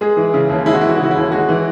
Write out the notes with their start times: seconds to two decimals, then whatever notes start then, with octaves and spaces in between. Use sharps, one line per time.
0.01 G#3 G#4
0.17 E3
0.34 C#3
0.50 D#2
0.66 G#3 E4
0.73 F#4
0.81 E3 E4
0.89 F#4
0.96 E4
0.99 C#3 F#4
1.11 E4
1.16 D#2
1.32 G#3 F#4
1.49 E3